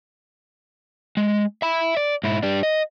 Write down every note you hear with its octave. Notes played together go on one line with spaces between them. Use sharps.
G#3
E5 B5
D5
G#2 E4
G3 D4
D#5